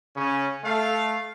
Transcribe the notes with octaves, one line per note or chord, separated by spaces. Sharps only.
C#3 C#4
A3 F5